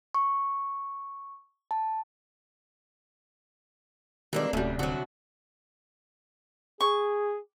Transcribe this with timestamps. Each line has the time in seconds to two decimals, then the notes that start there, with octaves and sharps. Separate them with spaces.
0.15 C#6
1.71 A5
4.33 D#3 E3 G3 G#3 A#3 C4 D4
4.53 D1 C2 F#3 G3 A3 C#4 F#4
4.79 D3 F#3 C4 D4 F#4
6.81 G#4 C#6